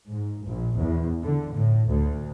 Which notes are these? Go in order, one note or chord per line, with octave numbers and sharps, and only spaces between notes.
G#2
A#1
E2
D3
A2
D2